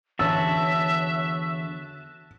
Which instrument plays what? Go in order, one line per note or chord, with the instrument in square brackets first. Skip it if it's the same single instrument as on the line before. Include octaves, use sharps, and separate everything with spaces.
[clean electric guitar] E2 D3 C#5 [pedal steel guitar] F#4 A5 [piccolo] E5 [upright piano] E6